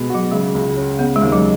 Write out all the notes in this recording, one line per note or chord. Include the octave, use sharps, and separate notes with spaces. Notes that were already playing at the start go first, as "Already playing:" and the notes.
Already playing: B2 G#3
F#3 F#4
C#3 G#3
C#2
C#4
C#3 B3
G#3
D#2
F#3